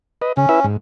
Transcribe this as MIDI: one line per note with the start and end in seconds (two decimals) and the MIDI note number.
0.22 0.32 71
0.22 0.32 75
0.37 0.46 49
0.37 0.66 61
0.49 0.60 64
0.49 0.60 71
0.49 0.60 76
0.64 0.77 44